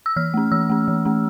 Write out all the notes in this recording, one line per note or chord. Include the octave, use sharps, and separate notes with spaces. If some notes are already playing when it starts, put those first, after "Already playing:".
E6
E3 F6
A3 C#4
E3 E6
A3 C#4
E3
A3 C#4